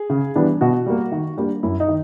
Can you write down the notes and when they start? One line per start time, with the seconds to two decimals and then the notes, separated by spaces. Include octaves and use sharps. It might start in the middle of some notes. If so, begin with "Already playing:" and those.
Already playing: G#4
0.10 C#3
0.36 E3 G3 B3 D4
0.61 B2 F#4
0.86 G3 A#3
1.12 D#3
1.38 G3 A#3 D4
1.63 F#2 E4
1.80 D#4
1.88 D#3